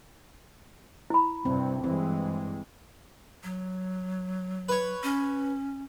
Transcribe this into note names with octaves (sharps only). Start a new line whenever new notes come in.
E4 B5
G2 C3 C4
G2 E3 G#3 C4
F#3
B4 C#5
C#4